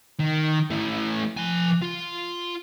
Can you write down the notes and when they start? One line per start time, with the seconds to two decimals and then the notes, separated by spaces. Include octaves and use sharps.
0.20 D#3
0.70 E3 A3
1.37 F3 G#5
1.82 F4